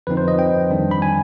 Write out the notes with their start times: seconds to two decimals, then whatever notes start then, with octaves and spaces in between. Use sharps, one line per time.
0.07 F2 D3 F3 C4 D#4 B4
0.17 C5
0.28 D#5
0.39 G5
0.70 F2 D#3 G3 D4
0.91 B5
1.02 G#5